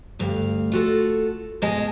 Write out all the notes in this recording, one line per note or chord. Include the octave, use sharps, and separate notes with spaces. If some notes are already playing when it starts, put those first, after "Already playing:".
D2 G2 F5
F4 F#4 A4
G#2 B2 G#3 G#4 D#5 A5